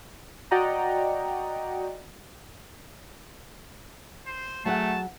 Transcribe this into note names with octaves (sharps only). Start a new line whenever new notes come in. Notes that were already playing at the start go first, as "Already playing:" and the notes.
F#4 D5 D#5 F#5 G5 A#5
C5
F#3 A3 G#4 F#5 A5